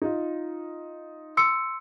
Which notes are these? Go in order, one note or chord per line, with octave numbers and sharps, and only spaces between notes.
D#4 F4
C6 E6 C#7